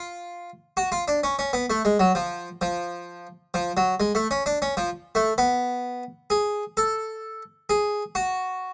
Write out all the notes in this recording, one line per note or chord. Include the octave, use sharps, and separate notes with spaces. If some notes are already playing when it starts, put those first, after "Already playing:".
Already playing: F4
F#4
F4
D4
C#4
C#4
B3
A3
G#3
F#3
F3
F3
F3
F#3
G#3
A3
C#4
D4
C#4
F3
A3
B3
G#4
A4
G#4
F#4